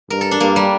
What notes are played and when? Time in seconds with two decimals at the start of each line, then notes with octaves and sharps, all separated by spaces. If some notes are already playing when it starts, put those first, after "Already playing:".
0.10 G2 A#4
0.21 A4
0.31 D4
0.40 G2 A#3
0.56 G3